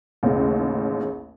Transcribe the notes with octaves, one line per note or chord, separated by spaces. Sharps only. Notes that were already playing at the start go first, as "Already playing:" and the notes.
A1 D#2 C#3